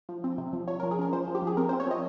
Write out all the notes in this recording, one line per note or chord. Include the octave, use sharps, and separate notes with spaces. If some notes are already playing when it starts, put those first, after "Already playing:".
F3
C4
C3
F3
F3 C#5
A#4
F3
G#4
C#4 A#4
F3 C5
F3
G4
F3 G#4
C4 A#4
C5
C4
C#5
F3 D#5